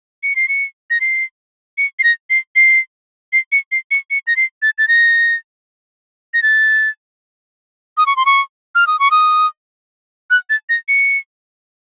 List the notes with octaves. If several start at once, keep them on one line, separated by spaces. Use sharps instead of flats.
C#7
C7
C#7
A#6
C7
C#7
C7
A#6
C7
C7
C7
C#7
C7
C#7
C#7
A#6
C7
A6
A6
A#6
A#6
A6
D#6
C#6
C6
C#6
F6
D#6
C#6
D#6
F#6
A6
A#6
C#7